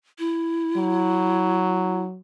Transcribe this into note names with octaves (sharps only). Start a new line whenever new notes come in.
E4
F#3